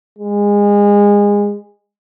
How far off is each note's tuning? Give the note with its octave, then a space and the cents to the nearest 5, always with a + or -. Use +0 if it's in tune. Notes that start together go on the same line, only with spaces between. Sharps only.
G#3 -25